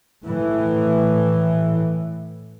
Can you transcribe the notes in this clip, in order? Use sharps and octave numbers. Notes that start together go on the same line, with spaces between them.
A2 E3